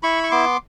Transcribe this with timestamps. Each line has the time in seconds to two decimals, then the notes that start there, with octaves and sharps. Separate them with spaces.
0.03 E4 B5 C#6
0.23 C#6
0.31 B3 C6 D6